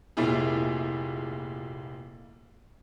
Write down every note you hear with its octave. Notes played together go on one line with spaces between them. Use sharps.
F1 A#2 E4 G#4